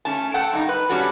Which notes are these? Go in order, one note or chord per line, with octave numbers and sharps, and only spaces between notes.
A3 C#4 A5
A4 F#5 G5 A5
G2 D#4
B4
G3 C#4 D4 F#4 A4